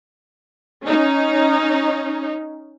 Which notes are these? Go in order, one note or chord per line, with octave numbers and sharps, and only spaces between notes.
C#4 D#4